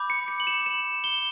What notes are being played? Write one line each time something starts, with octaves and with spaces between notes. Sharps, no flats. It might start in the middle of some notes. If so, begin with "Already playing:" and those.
Already playing: B5 D6 G6
C#7
C#7
F#7
E7
E7
G7